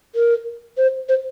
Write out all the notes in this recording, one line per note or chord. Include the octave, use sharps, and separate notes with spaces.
A#4
C5
C5